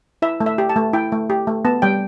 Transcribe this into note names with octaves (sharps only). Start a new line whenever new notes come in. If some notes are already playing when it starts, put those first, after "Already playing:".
E4 E5
A3
E5
G4
A5
A3
E4 G5
A3
G4
A3
B3 A5
G3 G5